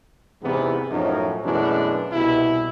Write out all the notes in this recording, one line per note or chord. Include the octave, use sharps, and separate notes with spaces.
E2 G#2 C3 E3 B3
F#2 A2 F3 F#3 D#4
F#2 B2 E3 G#3 A3 D4
C2 B2 E4